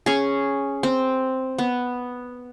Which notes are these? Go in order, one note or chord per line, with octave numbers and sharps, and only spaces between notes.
C#4 G#4
C4
B3